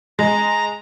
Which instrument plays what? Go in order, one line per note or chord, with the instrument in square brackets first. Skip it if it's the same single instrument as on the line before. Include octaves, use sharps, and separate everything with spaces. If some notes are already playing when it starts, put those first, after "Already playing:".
[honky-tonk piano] G#3 [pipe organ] A#5